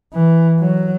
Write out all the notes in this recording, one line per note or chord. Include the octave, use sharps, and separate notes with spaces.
E3
F#3